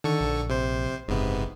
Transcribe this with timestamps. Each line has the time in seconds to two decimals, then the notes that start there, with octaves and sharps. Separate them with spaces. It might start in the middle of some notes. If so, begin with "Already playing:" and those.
0.04 D3 D#3 A4 C#6
0.20 A#1
0.50 C3 C5
1.08 F#1 G#2 C3 B3